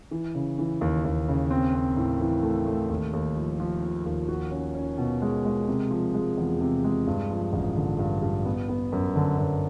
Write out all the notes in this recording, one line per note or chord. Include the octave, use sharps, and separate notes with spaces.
E3
C#3
E3
D#2
D#2
C#3
C4
C4
A2
E3
A3
A3
D#2
D#2
F3
F3
F3
D#2
F#4
C#4
C#4
B2
G#3
G#3
C3
F3
G#3
E2
C3
G#3
G2
F3
A1
D3
G2
G2
B3
B3
F#2
D3
F#2